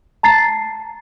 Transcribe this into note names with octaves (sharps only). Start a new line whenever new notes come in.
A5 A#5 A6 C7